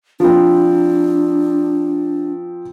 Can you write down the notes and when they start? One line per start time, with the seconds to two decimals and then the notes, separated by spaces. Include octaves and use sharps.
0.20 F3 C4 D4